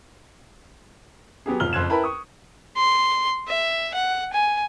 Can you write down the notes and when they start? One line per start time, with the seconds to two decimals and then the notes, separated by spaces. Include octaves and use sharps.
1.46 F#3 B3 G4 G#4
1.60 F1 F3 F6 G7
1.73 F#1 F2 C6 F#6 G#6 E7
1.90 E4 A#4 B4 G5 A5 B5
2.04 C#6 D#6
2.76 C6
3.48 E5
3.95 F#5
4.33 G#5